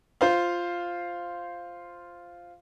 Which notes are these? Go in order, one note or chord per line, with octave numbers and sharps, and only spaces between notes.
F4 C5 F5